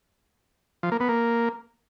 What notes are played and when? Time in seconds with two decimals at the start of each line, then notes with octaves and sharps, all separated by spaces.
0.83 F3
0.92 A#3
1.00 B3
1.09 A#3